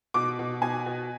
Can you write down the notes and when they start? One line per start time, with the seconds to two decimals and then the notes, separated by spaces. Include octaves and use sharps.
0.14 B2 D6
0.39 B2
0.62 B2 G#5
0.86 B2